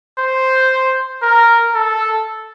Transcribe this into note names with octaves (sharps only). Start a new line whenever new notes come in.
C5
A#4
A4